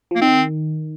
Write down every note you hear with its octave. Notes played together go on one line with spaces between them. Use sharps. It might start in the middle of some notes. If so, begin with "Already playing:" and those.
F3 A#3
D#3 C4